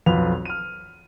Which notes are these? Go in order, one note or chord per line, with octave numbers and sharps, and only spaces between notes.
B1 F2 F4 B4 F7
F6 D#7